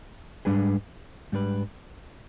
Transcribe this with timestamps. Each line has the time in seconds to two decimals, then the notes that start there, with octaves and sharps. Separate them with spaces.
0.45 G#2 G3 D4 G#4 B4
1.32 G#2 G3 D4 G#4 B4